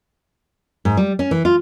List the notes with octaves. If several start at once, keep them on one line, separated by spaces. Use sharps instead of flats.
G#2
G3
C#4
E3
F4